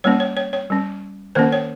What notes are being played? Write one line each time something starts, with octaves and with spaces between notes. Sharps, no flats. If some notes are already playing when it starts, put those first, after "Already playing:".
G3 A#3 C#4 C#5
C#5
C#5
C#5
G3 C#4
D#3 A#3 C#4 C5
C#5